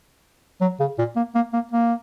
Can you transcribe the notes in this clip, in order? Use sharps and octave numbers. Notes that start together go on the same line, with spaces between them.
F#3
C#3
A#2
A#3
A#3
A#3
A#3